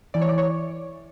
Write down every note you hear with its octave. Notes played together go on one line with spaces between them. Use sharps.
E3 D5
C#5
D5
E3
C#5